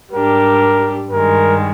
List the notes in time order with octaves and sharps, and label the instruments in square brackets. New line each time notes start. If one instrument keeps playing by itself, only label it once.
[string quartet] G#2 G3 D4 G4 [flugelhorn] A#4
[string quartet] G2 D#3 G#3 [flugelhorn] A#4